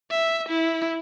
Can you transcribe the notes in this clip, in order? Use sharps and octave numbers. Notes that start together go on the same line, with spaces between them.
E5
E4